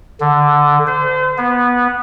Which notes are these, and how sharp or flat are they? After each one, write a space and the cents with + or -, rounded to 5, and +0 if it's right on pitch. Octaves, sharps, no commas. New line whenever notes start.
D3 +0
C5 -35
B3 -15